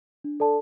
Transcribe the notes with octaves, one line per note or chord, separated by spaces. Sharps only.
D4
A4 D5 A5